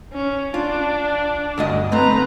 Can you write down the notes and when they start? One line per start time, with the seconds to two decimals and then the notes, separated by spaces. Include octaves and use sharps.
0.13 C#4
0.54 D4 F4
1.58 D2 G2 D#5
1.92 A3 C4 B4 A#5